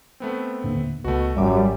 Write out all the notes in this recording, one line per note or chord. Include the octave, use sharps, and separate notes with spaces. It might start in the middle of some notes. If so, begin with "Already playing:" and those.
A3 B3 C4
D#2 A#2 D3
C#2 B2 A3 F#4
G#1 F#2 F3 G3 E5 D6